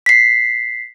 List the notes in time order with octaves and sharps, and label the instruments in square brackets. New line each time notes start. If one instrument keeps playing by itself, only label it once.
[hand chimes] B6 C7